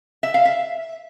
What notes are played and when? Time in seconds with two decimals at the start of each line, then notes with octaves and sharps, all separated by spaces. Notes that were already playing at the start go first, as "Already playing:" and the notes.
0.23 E5
0.34 F5
0.45 E5